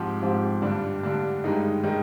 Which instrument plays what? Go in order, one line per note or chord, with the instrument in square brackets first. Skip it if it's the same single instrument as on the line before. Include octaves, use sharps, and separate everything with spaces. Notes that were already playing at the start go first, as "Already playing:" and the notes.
Already playing: [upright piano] G#2 F3 C4 G4
G#2 F3 C4 G4
G2 D3 G3 D4
G2 D3 G3 D4
G2 D#3 G#3 D#4
D#3 G#3 D#4